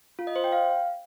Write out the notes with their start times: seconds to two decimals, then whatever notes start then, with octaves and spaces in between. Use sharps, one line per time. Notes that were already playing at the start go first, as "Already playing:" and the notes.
0.19 F4
0.27 D#5
0.36 C5
0.44 G5
0.52 F5